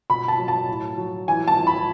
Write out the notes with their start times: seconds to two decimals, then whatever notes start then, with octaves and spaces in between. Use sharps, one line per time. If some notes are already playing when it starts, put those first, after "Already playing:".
0.10 B2 B5
0.28 A5
0.38 F#3
0.48 A5
0.68 A2
0.98 F#3
1.28 E3 G#5
1.48 A5
1.58 E3
1.67 B5